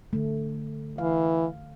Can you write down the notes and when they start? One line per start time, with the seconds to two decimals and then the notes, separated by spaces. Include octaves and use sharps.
0.13 D3 A3
0.98 E3 F5